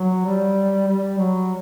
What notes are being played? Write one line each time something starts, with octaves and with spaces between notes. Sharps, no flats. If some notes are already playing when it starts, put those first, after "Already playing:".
Already playing: F#3
G3
G3
F#3